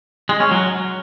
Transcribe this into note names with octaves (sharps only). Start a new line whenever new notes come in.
G#3
C#4
F#3